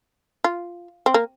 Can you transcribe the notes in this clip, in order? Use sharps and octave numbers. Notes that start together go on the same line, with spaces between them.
F4
C4
A#3